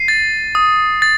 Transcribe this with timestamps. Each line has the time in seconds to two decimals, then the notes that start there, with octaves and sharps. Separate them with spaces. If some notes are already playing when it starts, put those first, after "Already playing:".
Already playing: C7 D#7
0.08 A6
0.55 D#6
1.02 A6